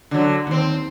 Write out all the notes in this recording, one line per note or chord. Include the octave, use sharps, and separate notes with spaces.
D3 F#3
D#2 C4